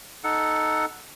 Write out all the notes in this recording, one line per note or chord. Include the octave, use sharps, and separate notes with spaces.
D#4 A4 F#5